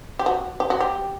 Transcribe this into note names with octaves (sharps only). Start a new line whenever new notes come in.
G4
F#4
G4
F#4
G4